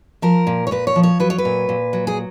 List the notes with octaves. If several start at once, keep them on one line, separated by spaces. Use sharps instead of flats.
F3 A#4
A#2
C#5
A#2 B4
C#5
F3
C#5
F#3 B4
C#5
B4
A#2
A#2
F#3
G#4